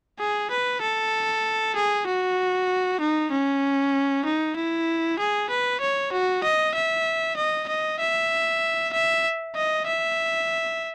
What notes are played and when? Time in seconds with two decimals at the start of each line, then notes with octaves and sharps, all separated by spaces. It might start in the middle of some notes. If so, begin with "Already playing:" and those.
0.20 G#4
0.51 B4
0.81 A4
1.75 G#4
2.07 F#4
3.00 D#4
3.31 C#4
4.25 D#4
4.56 E4
5.19 G#4
5.50 B4
5.81 C#5
6.12 F#4
6.43 D#5
6.75 E5
7.37 D#5
7.68 D#5
8.00 E5
8.93 E5
9.55 D#5
9.87 E5